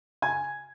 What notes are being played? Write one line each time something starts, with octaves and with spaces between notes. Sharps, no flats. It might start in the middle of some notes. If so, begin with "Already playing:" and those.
G#5 G#6